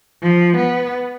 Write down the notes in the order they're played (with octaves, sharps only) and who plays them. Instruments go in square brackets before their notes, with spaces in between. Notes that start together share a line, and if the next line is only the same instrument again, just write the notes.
[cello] F3
B3